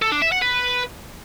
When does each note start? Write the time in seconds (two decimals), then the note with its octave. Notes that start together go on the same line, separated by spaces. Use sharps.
0.02 A4
0.12 D4
0.22 E5
0.32 F#5
0.42 B4